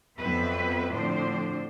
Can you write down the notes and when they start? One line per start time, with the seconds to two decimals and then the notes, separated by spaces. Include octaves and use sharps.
0.18 F2 F#3 B3 C4 B4 E5
0.91 A2 D3 F3 C4 D4 C5